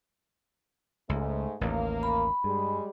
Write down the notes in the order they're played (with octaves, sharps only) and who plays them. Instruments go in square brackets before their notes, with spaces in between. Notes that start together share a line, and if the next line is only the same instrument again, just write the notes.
[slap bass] C#2 [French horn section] G#2 A3
[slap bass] A1 D#2 [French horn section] A#3
[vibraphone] B5
[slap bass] G2 [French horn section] G3 G#3